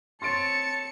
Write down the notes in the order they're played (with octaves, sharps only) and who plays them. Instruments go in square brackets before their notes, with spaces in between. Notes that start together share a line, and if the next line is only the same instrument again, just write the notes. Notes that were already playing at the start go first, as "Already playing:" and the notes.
[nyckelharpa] C4 C#5 [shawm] A5 [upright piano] C6 A6 D7 [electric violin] C#7